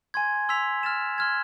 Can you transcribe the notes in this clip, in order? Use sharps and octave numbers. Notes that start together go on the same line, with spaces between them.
G#5 C6 G#6
C6 E6 B6 F7
F6 A6 E7
C6 F6 G#6